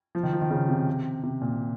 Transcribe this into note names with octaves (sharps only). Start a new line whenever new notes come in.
F3
D#3
F3
D#3
C#3
C3
C3
A#2